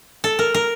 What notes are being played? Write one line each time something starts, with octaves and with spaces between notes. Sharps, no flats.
A4
A#4
A#4